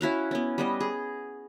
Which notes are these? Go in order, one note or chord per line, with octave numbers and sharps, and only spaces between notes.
C#4 E4 F#4 F5
B3 C#4
G3 B3 D#5
G#4